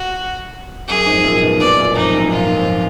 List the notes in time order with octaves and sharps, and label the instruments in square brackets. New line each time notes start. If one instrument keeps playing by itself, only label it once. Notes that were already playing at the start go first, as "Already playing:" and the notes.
Already playing: [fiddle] F#4
[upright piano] F#2 [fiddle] G#4
[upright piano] F2 G#2
F#2 A#2
G#2 B2
[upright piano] G#2 B2 [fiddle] D5
[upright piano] F#2 A#2
[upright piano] F2 G#2 [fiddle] D#4
[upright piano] F#2 A#2
[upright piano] F2 G#2 [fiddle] F4
[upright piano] F2